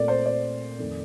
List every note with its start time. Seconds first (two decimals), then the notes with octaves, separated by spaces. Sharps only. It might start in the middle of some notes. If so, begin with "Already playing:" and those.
Already playing: A#2 A3 C4 D5
0.08 C5
0.26 D5
0.79 F2 D#3 A3 C4